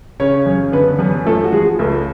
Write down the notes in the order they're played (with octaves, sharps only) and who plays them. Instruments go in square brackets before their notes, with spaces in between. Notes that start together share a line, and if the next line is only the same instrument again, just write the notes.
[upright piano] C#3 C#4 C#5
F#2
D3 B3 B4
F#2 B3 B4
F3 A3 A4
F#4
F3 G#3 G#4
C#2 A3 A4